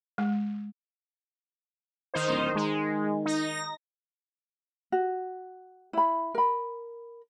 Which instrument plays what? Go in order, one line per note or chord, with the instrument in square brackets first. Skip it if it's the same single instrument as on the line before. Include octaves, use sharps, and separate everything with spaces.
[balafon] G#3
[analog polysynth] D#3 D#4 C5
[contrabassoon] D1
[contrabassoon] D#3 [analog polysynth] G#3
[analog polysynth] D#4 A#6
[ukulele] F#4
E4 B5
A#4 B5